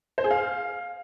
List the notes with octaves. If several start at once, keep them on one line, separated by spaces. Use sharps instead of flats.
C5
G#4
F5